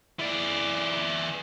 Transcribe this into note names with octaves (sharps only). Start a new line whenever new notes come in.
E3 D5